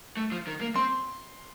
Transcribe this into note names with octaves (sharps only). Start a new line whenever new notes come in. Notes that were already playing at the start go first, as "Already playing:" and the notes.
A3
F3
D#3
A#3
C4 C6